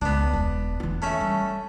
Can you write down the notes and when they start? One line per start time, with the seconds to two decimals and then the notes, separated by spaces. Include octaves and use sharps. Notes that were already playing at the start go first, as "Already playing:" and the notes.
0.02 C#2 B3 D4
0.33 E1
0.80 E3 F4
1.02 A3 C#4 E5
1.21 G3